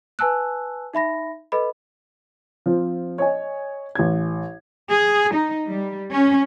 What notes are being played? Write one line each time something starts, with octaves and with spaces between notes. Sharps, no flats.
B4 G#5 A5 E6 F#6
D#4 E5 B5 A#6
A4 B4 D#5 B5
F3 C4
C#5 D#5 G#5
A1 G#6
G#4
D#4
G3
C#4